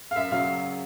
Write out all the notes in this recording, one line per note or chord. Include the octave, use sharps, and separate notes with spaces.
F5
F#2 E5
C#3 F#3 F5